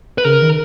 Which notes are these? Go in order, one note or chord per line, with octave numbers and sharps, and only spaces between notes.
B4
C#3 A#4
D#3